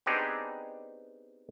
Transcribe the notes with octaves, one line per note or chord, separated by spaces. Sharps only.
B3 C4 D4 D#4 G4 G#4